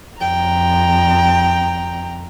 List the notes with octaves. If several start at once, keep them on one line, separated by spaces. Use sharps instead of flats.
F2 G5 A#5